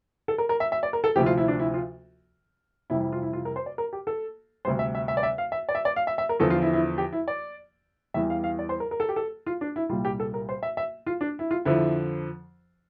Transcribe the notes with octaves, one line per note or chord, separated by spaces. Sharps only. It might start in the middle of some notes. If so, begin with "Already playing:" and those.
A4
A#4
A#4
E5
E5
D5
A#4
A4
D2 C3 F3 E4 G4
F4
E4
D4
E4
F4
F2 C3 E3 G3 E4
E4
F4
E4
F4
A#4
C5
D5
A#4
G4
A4
D2 C3 G3 C5
E5
E5
E5
D5
E5
F5
E5
D5
E5
D5
F5
E5
E5
A#4
E2 D3 F3 A4
F4
E4
E4
G4
E4
D5
E2 E3 G3 E5
F5
F5
D5
C5
A#4
A#4
A4
G4
A4
F4
D4
E4
C2 A#2 G3 F4
G4
A4
A#4
C5
E5
E5
F4
D4
E4
F4
F2 D3 F3 E4